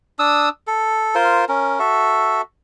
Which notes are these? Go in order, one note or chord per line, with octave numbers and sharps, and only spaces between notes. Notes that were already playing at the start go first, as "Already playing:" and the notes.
D4 D#6 E6
A4
F4 A#4 C5
C#4 A#4
F#4 A4 E5